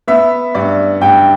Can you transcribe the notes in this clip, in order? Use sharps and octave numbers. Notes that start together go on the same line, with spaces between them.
B3 E5
G2 D5
G2 G5